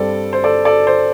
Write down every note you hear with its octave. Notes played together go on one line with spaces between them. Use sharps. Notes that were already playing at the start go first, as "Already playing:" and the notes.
Already playing: G2 G3 C4 A4 D5
C5
A4 D5
A4 D5
C5